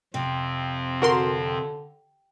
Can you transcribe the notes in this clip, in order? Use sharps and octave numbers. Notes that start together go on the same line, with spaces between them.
F2 C3 C4
D3 F#4 A#4 C6